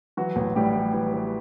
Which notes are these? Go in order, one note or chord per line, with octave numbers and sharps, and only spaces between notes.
E3 F#3 F#4
A1
A2 G3 G4
E3
E3
E3